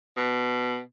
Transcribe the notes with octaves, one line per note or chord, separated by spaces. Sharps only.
B2